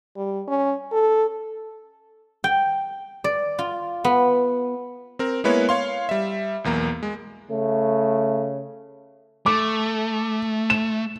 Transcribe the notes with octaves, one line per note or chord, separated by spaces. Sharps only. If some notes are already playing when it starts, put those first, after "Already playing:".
G3
C#4
A4
G5
D5
F4
B3
C4 A#4
G#3 A#3 B3 E4 B4 C#5
C#5 F5 C6
G3 E5
B1 E2 A#3 A#5
G#3
C#3 A3
A3 D6
E7